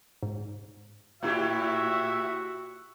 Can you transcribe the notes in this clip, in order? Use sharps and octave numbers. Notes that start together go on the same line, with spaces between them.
G#2
A2 E4 F#4 G4 E5